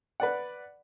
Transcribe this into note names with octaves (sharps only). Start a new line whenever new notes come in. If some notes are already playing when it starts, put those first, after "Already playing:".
B4 D5 F#5